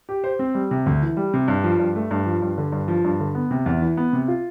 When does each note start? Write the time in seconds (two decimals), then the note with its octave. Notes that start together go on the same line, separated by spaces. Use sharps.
0.09 G4
0.24 C5
0.39 C4
0.55 G3
0.71 C3
0.86 D2
1.02 E3
1.17 G3
1.33 C3
1.48 G2
1.64 F3
1.79 G2
1.96 A3
2.11 G2
2.26 F3
2.42 G2
2.58 D3
2.72 G2
2.88 F3
3.04 G2
3.20 D3
3.35 B3
3.51 C3
3.66 E2
3.82 E3
3.97 B3
4.13 C3
4.28 F4